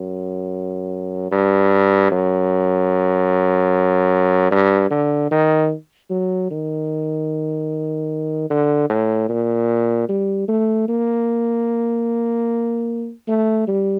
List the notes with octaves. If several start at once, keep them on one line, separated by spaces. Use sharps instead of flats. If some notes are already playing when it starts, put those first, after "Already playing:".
Already playing: F#2
G2
F#2
G2
D3
D#3
F#3
D#3
D3
A2
A#2
G3
A3
A#3
A3
G3